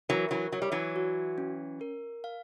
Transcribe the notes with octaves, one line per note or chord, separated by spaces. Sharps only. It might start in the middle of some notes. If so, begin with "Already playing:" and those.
E3 F#3 A#4
E3 F#3
F#3 C#5
G3
E3 F#3
F#4
C#4
A#4
F5